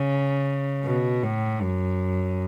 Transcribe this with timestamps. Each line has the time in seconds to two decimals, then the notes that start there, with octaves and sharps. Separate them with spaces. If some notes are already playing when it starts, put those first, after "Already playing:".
Already playing: C#3
0.85 B2
1.24 A2
1.62 F#2